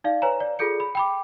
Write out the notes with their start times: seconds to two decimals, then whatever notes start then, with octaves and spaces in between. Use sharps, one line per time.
0.04 D#4 D5 F5
0.22 B4 C#5 G#5 A#5
0.40 D5
0.59 F4 G#4 A4 G6 C#7
0.80 B5
0.95 G5 B5 D6